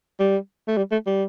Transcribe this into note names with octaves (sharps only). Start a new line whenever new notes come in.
G3
A3
G3
A3
G3